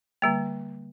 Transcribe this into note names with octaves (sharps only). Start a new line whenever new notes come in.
D3 G3 A#3